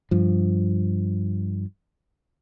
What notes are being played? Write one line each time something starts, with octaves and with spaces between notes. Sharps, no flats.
G2 F3